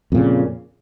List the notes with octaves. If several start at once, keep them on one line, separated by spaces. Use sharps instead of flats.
F2 A#2 C#3